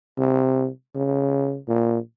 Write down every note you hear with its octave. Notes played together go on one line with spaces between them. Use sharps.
C3
C#3
A#2